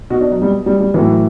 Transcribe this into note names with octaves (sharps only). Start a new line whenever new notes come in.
B2 F#4
D4
F#3
G3
G3
G3
A2 E3 F#3